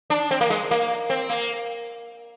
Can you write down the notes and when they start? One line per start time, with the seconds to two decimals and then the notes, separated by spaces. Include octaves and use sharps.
0.10 D4
0.31 C4
0.41 A#3
0.50 G#3
0.71 A#3
1.10 C4
1.29 A#3